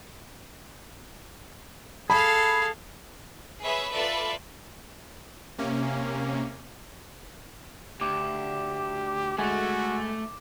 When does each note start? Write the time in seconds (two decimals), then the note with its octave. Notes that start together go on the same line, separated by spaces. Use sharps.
2.10 G#4 A4 F5 B5
3.62 G#4 B4 C#5 E5
3.92 F4 A4 B4 D5 E5
5.58 C3 A#3 C#4
8.01 D2 G4 D6
9.38 D2 G#3 A3 F#4 G#5